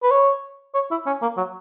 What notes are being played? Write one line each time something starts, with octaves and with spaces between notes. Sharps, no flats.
B4
C#5
C#5
E4
C#4
A#3
F#3